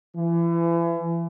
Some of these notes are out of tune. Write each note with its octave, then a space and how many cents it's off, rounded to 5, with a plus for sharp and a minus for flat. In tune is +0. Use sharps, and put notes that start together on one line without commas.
E3 +35